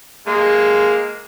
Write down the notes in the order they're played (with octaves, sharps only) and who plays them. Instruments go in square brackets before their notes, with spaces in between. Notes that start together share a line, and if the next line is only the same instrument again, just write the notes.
[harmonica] G#3 A#3